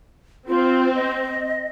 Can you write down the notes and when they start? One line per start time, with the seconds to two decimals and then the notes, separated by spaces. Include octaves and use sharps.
0.48 C4 F4
0.95 D#5